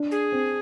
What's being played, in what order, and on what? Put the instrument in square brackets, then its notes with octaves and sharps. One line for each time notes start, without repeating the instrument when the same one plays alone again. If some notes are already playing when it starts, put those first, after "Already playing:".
Already playing: [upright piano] D4
[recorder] G#4
[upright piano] C4